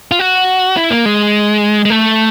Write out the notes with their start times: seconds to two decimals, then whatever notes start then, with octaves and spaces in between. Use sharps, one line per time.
0.11 F4
0.19 F#4
0.77 E4
0.91 A#3
1.05 G#3
1.85 G#3
1.90 A3